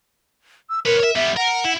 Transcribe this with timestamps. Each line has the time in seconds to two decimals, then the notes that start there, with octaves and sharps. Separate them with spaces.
0.70 E6
0.85 A#4 B4 C#5
0.99 C#5 E5
1.16 G3 B3 E5
1.37 A#4 F#5
1.65 E4